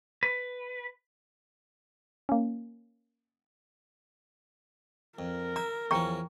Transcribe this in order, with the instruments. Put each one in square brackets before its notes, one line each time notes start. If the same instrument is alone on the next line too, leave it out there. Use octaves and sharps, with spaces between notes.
[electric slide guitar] B4
[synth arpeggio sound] A#3 C#4
[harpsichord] F2 [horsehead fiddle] A#4
[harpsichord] E5 [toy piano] A#5
[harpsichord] E2 F3 C#4 [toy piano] G5 A#5 C#6